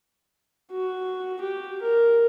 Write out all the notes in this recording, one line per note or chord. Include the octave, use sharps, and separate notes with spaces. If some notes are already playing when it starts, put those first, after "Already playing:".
F#4
G4
A#4